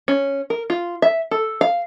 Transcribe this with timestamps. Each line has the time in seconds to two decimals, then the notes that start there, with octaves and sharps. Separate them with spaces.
0.08 C#4
0.50 A#4
0.70 F4
1.02 E5
1.31 A4
1.61 F5